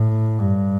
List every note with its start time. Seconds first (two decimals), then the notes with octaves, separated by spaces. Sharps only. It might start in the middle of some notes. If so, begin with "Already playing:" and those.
Already playing: A2
0.39 G2